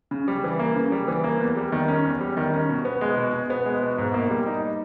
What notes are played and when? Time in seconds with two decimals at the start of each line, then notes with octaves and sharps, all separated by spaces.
0.11 C#3
0.28 G3
0.44 E3
0.59 A#3
0.76 C#3
0.92 G3
1.08 E3
1.24 A#3
1.40 E2
1.57 G3
1.72 D#3
1.88 C#4
2.05 E2
2.21 G3
2.37 D#3
2.54 C#4
2.69 B2
2.85 B3
3.01 G#3
3.18 B2
3.34 B2
3.50 B3
3.66 G#3
3.82 B2
3.98 G#2
4.14 A#3
4.30 G3
4.46 D#4